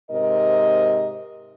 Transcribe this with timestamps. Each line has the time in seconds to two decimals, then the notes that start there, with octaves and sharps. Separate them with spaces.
0.10 G#2 C3 A#4 D#5